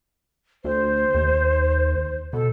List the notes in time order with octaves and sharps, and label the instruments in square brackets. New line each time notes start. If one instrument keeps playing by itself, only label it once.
[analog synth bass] D2 [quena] C5
[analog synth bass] D#2
[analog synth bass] B2 [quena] A4